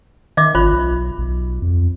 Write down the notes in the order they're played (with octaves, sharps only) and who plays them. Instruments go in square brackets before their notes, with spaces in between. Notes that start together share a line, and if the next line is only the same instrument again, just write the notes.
[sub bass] D#3 [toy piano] D#5 E5 D6
[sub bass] G#1 [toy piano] F4 C#5 B5
[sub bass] B1
B1
F2